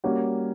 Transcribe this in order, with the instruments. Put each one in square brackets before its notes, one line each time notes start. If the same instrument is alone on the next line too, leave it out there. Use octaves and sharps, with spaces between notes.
[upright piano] G3 A#3 C#4 F#4